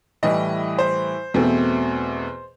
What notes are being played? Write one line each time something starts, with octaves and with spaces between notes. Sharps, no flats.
A2 E3 G3 D#5
C5
E2 B2 A3 C4